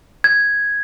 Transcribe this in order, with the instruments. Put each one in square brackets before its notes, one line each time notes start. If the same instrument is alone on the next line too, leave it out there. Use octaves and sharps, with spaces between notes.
[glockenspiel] G#6